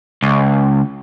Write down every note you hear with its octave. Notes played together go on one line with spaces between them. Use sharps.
C#2